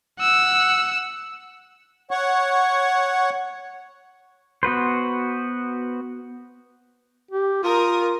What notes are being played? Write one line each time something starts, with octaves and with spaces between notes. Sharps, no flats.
F#5 E6
C#5 F#5 C#6
B3 F#4 B4 C5
G4
F4 A#4 D#6